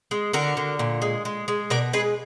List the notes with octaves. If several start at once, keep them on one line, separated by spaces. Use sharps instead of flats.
G#3
D3 F#4 A#4
D3
A#2
G#3
G#3
G#3
B2 A#4 D5
G#3 G#4 B4